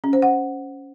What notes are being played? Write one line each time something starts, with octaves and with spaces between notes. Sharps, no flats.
C#4
C5
F#5